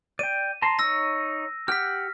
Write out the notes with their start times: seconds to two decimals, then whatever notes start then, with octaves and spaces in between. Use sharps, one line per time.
0.19 D5 G5 D#7
0.62 A5 A#5 C6
0.79 D#4 C#5 E6 A#6
1.68 G4 F#5 D6 F6 B6